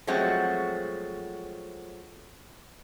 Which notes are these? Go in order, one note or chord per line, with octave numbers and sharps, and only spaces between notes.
F3 F#3 G#3 A3 C4 F#4